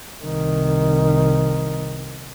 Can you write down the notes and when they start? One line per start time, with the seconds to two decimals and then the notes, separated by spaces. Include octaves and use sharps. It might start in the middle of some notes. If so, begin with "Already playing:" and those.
0.25 C2 D#3